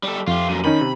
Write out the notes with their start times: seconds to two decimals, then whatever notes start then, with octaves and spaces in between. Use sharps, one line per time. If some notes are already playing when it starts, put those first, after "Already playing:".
0.03 G3 A4
0.27 F2 F4 G4
0.49 F#2 A#2 D#7
0.65 D#3 C#4 D#4 B5
0.81 C3